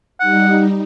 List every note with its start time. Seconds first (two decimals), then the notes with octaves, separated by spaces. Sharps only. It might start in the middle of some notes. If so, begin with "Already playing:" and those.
0.20 G3 D#4 F#5